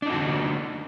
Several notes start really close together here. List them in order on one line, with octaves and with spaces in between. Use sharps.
D4 D#4 F#4 D3